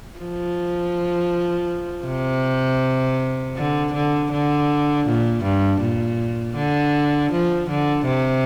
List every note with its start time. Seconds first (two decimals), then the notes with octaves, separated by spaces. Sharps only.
0.19 F3
2.05 C3
3.56 D3
3.93 D3
4.32 D3
5.07 A#2
5.44 G2
5.81 A#2
6.56 D3
7.32 F3
7.70 D3
8.06 C3